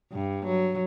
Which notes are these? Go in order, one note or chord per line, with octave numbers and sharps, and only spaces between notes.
G2
F#3